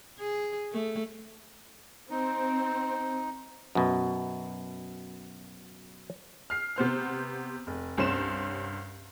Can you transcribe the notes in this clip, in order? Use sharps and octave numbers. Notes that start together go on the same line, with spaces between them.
G#4
A3
C4 D#4
F#2 B2
F6 C7
C3 B3 C5 F6
F1
C2 G2 C#4 C5 E7